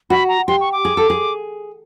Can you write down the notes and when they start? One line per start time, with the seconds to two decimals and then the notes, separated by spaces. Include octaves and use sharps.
0.10 F#4 B5
0.29 A#5
0.48 G4 C6
0.61 C#6
0.72 D6
0.85 G#4
0.97 A4
1.10 G#4